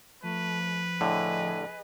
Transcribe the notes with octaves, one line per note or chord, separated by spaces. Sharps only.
F3 A3 B4
A2 D3 G#4 D#5